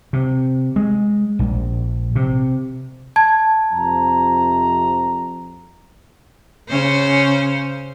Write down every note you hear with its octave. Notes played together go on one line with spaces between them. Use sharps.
C3
G#3
A#1
C3
A5 G#6
F2 C3 A#5
C#3 C#4 C5